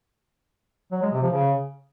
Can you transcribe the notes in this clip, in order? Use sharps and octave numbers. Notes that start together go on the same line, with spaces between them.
F#3
G#3
C3
F3
C#3